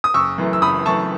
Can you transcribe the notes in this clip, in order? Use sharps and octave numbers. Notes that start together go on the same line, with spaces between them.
D#6
F#1 C#6 E6
F#2 E3 A3
E6
F#1 B5 D#6
F#2 E3 A3 A5 C#6